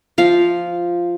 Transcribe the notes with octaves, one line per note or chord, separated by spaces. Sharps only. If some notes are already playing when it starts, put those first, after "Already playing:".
F3 F5